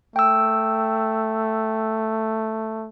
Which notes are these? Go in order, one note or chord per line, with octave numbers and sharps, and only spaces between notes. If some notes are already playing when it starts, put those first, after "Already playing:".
A3 G5 E6